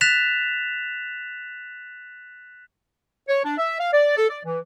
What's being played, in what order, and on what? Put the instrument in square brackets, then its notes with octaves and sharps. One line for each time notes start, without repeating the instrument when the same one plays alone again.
[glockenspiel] F#6 A6 B6 E7 F7
[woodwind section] C#5
D4
E5
F5
D5
A4
D5
E3